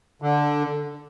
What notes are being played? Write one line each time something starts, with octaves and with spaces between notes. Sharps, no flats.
D3